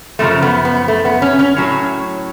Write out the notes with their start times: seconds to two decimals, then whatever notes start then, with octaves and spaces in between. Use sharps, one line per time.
0.19 F#2 C#3 F3 A3
0.43 B3
0.65 B3
0.88 A3
1.05 B3
1.22 C#4
1.39 C#4
1.57 A2 F#3